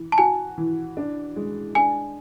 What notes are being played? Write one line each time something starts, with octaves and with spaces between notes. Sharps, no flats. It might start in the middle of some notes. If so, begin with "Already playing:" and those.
Already playing: E3
A5
F#4 G#5
E3
D4
G#3
D4 G#5